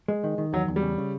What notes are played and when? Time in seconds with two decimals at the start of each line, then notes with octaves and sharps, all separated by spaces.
0.08 G#3
0.24 D#3
0.38 D#3
0.53 E2 F#3
0.68 E2
0.76 G3
0.82 C#3
0.98 C#3